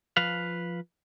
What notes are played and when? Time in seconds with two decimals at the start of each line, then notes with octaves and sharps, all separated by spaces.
0.17 F3 B4 F5